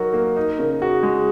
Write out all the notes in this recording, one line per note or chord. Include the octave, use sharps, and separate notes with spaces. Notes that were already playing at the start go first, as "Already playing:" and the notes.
Already playing: F#3 D#4 F#4 A#4
A#3
D#4
C#3
F#4 G#4
G#3